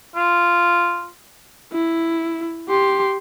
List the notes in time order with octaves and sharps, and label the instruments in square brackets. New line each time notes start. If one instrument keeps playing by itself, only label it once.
[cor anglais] F4
[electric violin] E4
G4 C6